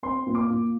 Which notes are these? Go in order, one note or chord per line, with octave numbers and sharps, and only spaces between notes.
C4 C6
A#2
D6
A#2